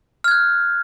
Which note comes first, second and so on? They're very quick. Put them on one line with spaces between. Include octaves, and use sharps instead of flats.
F6 G#6 F#6